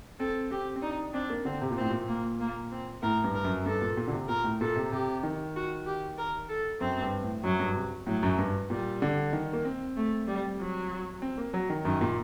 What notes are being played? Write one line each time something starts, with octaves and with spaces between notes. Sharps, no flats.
C4 A4
C4 G4
C4
D4 D#4
C4 D4
A#3
D3 C4
C3
A#2
A2 C4
A#2
A#3
A#3
C4
A2 A#4
G2
A#4
F#2
G2 A4
A#2
A#2
D3
C3
A#2 A#4
A2
A#2 A4
C3
C3 G4
D#3
F#4
G4
A#4
A4
F#2 C4
G2
A2
F#2 F#3
G2
C3
A2 F#3
F#2
G2
A#2 G3
D3
D#3
A#3
C4
A3
G3
F#3
C4
A#3
F#3
D#3
F#2 D#3
A#2